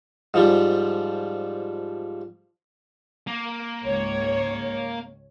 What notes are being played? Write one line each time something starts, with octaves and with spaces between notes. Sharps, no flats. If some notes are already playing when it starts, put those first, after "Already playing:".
G#2 F3 G3
A#3
C#2 G#2 C#5